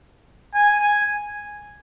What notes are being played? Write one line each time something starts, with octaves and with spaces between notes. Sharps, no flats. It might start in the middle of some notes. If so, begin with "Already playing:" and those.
G#5